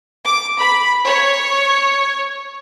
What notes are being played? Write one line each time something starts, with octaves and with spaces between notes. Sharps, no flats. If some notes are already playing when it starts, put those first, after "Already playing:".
D6
B5
C#5